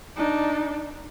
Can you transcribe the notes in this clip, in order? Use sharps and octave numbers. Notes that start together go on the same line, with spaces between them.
D4 D#4